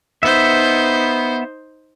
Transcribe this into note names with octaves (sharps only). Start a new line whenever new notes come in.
B3 D#4 C5 E5